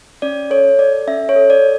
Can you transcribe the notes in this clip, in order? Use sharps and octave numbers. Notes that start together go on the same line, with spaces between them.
C#4 D5
A4 C#5
A4 D5
C#4 E5
C#5
A4
D5